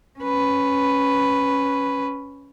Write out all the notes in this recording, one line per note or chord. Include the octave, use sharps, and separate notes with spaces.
C#4 B4